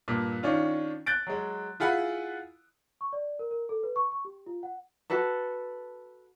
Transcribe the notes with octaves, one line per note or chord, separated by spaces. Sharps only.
G2 A#2
D#3 C#4 D4 F4
F#6 G6 A6 D7
F#3 G#3
E4 F4 G#4 F#5 G#5 B5
C#6
D5
A#4
A#4
A4
B4
C#6
C#6
G4
F4
F#5
F#4 A4 B4 A5